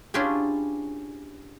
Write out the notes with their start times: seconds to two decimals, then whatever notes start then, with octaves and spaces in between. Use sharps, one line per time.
0.14 C#4 D4 E4 F4 G4 G#4